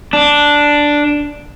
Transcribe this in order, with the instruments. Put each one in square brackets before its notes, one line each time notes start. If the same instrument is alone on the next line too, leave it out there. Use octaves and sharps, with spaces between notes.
[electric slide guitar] D4